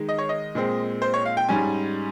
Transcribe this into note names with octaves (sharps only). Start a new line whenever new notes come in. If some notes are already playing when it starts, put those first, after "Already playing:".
Already playing: D#3 G#3 D#4
D#5
C#5
D#5
A#2 G#3 C4
C5
C#5
F5
G5
G#2 G3 C#4 G#5